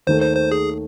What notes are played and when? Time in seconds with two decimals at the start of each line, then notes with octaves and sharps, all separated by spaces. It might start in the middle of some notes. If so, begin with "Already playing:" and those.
0.07 D#2 D#3 A3 C5
0.21 C5
0.36 C5
0.52 G#4